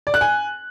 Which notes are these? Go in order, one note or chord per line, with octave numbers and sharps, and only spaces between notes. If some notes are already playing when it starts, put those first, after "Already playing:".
D5
F#6
G#5